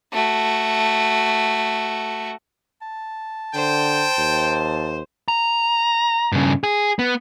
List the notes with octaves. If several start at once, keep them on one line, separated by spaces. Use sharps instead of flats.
A3 F#4
A5
D3 C5 G5
D#2
A#5
G2 C#3
G#4
B3